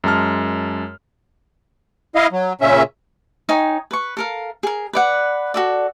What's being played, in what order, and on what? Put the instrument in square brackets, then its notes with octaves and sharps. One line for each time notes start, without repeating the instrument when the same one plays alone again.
[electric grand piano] F#2 G#3 A5 F6
[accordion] E4 D#5 F5
F#3
A#2 C#3 C#4 E5
[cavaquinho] D#4 C#5 G5 G#5
B4 C#6
A4 A#4 F5
G#4 A#4
B4 D5 F#5
F#4 A4 D5